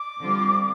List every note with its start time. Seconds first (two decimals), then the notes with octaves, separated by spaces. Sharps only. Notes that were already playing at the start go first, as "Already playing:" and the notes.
Already playing: D6
0.20 D3 G3 C4 F4